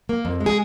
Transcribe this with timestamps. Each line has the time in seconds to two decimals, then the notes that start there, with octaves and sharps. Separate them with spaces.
0.09 A#3
0.25 F2
0.41 G#3
0.46 G#4